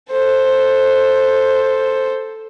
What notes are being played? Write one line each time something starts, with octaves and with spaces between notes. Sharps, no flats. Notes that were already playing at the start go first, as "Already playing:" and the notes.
A4 C5